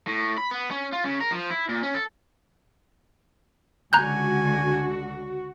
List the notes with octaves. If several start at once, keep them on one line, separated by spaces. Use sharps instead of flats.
A2
B5
B3
C#4
F4
C#3
A#4
F3
E4
A#2
C#4
A4
C#2 D3 F#4 G#5 A#5 F#6 G6